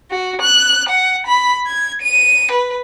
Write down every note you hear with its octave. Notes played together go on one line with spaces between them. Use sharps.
F#4
F#6
F#5
B5
G#6
D#7
B4